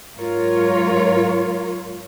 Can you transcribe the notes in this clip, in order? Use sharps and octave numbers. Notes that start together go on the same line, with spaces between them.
G#2 F#3 F4 A#4 C#5